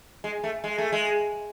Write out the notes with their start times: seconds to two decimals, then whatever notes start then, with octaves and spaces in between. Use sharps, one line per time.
0.24 G#3
0.44 A3
0.64 G#3
0.78 A3
0.92 G#3